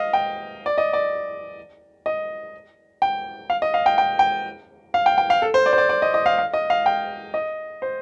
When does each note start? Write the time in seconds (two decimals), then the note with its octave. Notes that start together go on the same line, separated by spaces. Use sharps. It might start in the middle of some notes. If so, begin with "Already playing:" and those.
Already playing: D#5 F5
0.13 G5
0.66 D5
0.78 D#5
0.93 D5
2.06 D#5
3.02 G5
3.50 F5
3.62 D#5
3.74 F5
3.86 G5
3.98 G5
4.19 G5
4.94 F5
5.06 G5
5.18 G5
5.30 F5
5.42 A4
5.54 C5
5.66 D5
5.73 C5
5.78 D5
5.89 D5
6.02 D#5
6.14 D#5
6.26 F5
6.38 F5
6.54 D#5
6.70 F5
6.86 G5
7.34 D#5
7.82 C5